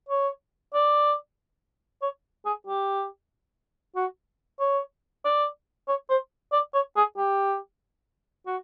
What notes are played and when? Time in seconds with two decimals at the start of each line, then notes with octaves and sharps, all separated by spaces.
0.09 C#5
0.74 D5
2.02 C#5
2.45 G#4
2.67 G4
3.96 F#4
4.60 C#5
5.25 D5
5.88 C#5
6.10 C5
6.53 D5
6.74 C#5
6.96 G#4
7.17 G4
8.46 F#4